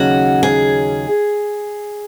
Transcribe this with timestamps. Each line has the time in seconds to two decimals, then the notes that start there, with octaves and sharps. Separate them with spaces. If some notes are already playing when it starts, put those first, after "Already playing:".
Already playing: D#2 C#3 F#3 C#4 F#4
0.43 G#4